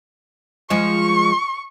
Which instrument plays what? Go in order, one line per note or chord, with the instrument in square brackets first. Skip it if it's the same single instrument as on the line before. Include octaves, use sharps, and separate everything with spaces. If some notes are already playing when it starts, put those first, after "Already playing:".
[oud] F3 G#3 [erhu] C#6